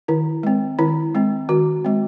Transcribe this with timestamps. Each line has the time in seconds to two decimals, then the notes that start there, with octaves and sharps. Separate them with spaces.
0.08 D#3 E4
0.43 G#3 C4
0.79 D#3 E4
1.15 G#3 C4
1.49 D#3 F#4
1.85 G#3 C4